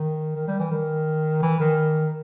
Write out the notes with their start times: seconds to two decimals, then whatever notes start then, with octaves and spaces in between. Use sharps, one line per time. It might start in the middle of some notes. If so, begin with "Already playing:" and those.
Already playing: D#3
0.35 D#3
0.47 G3
0.59 E3
0.71 D#3
1.42 E3
1.60 D#3